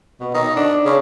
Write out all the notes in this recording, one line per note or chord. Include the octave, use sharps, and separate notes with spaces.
B2
D#4
D4
C#3